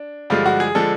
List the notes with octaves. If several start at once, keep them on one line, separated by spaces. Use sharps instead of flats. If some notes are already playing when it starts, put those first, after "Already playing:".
Already playing: D4
G2 D3 F3 G#3 F4
F#4
G#4
D3 F3 G#3 A4